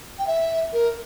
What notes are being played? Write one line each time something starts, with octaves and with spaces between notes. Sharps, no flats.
G5
E5
A#4